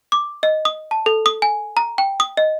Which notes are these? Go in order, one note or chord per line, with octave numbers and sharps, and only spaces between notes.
D6
D#5
D#6
A5
A4
D#6
G#5
A#5
G5
D#6
D#5